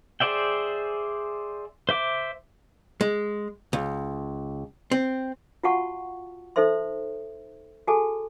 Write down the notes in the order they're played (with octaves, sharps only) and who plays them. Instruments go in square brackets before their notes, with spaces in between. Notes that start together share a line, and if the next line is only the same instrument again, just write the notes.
[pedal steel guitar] G#4 C5 D5 E5 G5
C5 E5 D6
[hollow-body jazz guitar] G#3
C#2
C4
[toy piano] F4 F#4 F5 F#5 A5 C#6
D#4 A4 C5 E5 C6
F#4 G#4 A4 G#5 A5